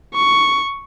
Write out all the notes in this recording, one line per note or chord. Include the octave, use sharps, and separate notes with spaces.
C#6